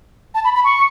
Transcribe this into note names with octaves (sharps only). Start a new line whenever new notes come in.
A5
B5
B5
C#6